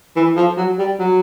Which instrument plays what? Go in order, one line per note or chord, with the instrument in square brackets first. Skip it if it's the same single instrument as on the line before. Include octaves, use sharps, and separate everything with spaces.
[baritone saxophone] E3
F3
F#3
G3
F#3